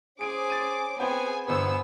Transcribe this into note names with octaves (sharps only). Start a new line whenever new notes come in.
C#4 G#4 C5 D6 D#6 D7
A6 D#7
B3 C4 G#4 C5 G5 G#5
G1 E2 B3 G#4 C5 E6